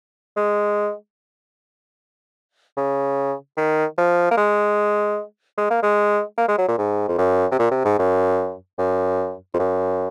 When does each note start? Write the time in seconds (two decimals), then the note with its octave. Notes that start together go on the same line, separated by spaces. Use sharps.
0.36 G#3
2.77 C#3
3.57 D#3
3.98 F3
4.31 A#3
4.37 G#3
5.58 G#3
5.70 A#3
5.83 G#3
6.38 A#3
6.48 G#3
6.58 F#3
6.68 A#2
6.78 G#2
7.08 F2
7.18 F#2
7.51 C3
7.59 A#2
7.71 C3
7.85 G#2
7.99 F#2
8.79 F#2
9.54 F2
9.59 F#2